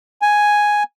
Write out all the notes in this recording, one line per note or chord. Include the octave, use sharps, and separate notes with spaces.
G#5